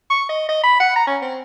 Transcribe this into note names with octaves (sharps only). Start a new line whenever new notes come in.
C#6
D#5
D#5
B5
F#5
A#5
C#4
C4